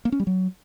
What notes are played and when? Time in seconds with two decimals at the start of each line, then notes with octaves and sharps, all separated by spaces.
0.05 A#3
0.12 C#4
0.20 G3
0.27 F#3